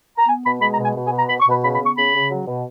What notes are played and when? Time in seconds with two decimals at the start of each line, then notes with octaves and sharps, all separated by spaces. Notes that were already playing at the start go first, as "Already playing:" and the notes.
0.18 A#5
0.27 B3 G#5
0.44 B2 B5
0.61 G#3 B5
0.72 A#5
0.78 B2
0.84 G#5
0.95 B2
1.06 G#5
1.12 B3
1.17 A#5
1.29 B2 B5
1.40 C#6
1.46 B2
1.51 B5
1.63 C#3 B5
1.74 B5
1.80 B3
1.85 C#6
1.96 C#3 B5
2.14 C#3
2.31 F#3
2.47 B2